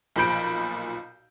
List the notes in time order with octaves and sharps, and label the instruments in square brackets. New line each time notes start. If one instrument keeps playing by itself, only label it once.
[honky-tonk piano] B1 A#2 F3 B5 G6 D7